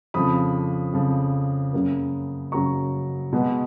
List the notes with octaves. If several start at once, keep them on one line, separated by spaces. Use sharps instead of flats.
F2 C#3 F3 B5 D#6
F2 C#3 F3
F#2 C#3 F#3 A#3
F#2 C#3 F#3 A#3 A#5 C#6
B2 G#3 B3